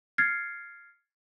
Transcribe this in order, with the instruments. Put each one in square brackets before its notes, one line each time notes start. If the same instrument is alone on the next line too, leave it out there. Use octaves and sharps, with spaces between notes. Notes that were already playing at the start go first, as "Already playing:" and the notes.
[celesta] F6 G#6 A6 C7 C#7